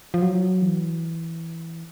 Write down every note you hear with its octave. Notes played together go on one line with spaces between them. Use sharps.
F3
F#3
E3